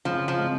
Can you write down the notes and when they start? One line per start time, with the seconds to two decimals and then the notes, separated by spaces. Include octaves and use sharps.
0.05 C#3 F3
0.28 F3
0.38 G#3 C4 F4